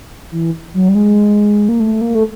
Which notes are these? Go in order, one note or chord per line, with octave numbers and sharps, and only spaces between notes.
E3
F#3
G3
G#3
A#3
A3
A#3
A3